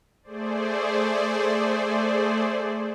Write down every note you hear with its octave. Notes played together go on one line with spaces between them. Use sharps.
A3 G#4 C5 D5